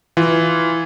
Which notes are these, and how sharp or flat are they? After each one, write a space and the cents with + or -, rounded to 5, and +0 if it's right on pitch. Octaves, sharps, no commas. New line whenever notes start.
E3 +0 F4 +0